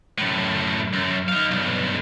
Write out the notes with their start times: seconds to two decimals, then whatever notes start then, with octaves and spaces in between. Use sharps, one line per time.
0.18 F#2 A2
0.93 F#2
1.28 D#4 F5
1.51 B1 G2